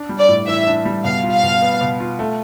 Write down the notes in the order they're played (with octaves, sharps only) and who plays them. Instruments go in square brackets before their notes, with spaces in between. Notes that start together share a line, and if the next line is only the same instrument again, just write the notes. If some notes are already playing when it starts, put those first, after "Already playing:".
Already playing: [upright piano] D4
G3
[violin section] D5
[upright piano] A2
[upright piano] E3 [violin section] E5
[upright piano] D4
G3
[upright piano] B2 [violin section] F5
[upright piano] F4
[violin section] F5
[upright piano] B2
B3
B2
F4
A3